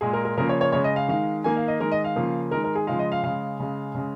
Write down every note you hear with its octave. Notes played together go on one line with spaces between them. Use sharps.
A#2 G#3 G#4
A#4
A#4
C#3 F3 A#3 A#4
C#5
C#5
C#3 G#3 C#5
D#5
F5
D#3 G#3 F5
D#3 A#3 G#5
F5
D#5
D#3 G#3 A#4
D#5
F5
C#3 F3 A#3
D#3 G#3 A#4
A#4
G#4
C#3 F3 G#3 F5
D#5
F5
C#3 G#3 F5
C#3 G#3
C#3 G#3